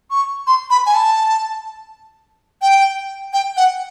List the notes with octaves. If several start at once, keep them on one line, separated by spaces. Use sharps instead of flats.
C#6
C6
B5
G#5
A5
G5
G5
F#5